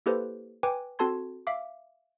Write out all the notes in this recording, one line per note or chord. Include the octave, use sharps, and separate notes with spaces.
A#3 E4 G4 A4 B4 C5
B4 G5 G#5 D6
C4 F#4 A4 A5 C6 G#6
E5 F5 D6